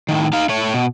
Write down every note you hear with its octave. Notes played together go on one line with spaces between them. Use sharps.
A2 D#3
D#4 F5
A3 C#5
B2